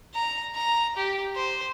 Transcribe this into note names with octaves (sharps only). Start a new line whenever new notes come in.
A#5
A#5
G4
C5